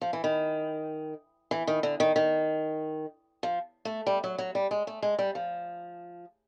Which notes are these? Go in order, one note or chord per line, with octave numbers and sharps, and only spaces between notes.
F3
E3
D#3
E3
D#3
D3
D#3
D#3
F3
A3
G3
F#3
F#3
G3
G#3
A3
G#3
G3
F3